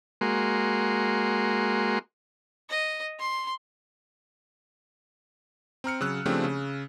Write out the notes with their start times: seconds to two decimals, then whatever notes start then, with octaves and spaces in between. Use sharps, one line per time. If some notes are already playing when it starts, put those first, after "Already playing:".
0.21 G#3 A#3 F#4 C6
2.70 D#5
3.19 C6
5.84 C4 A#5 F6 C#7
6.01 C#3 F#3 E6 F#6
6.25 C#3 F3 A3 C4 D4 G4
6.44 C#3